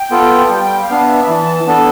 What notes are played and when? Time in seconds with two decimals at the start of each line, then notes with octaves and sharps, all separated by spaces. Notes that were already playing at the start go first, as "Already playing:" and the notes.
Already playing: G5
0.11 B3 F4 A4
0.43 A5
0.50 G3 G5
0.76 F5
0.90 B3 D4
1.02 E5
1.23 B5
1.28 E3 A5
1.67 B3 D4 A4